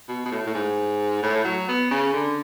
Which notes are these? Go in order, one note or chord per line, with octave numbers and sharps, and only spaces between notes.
B2
B2
A2
A2
G#2
A2
F#3
B3
C#3
D3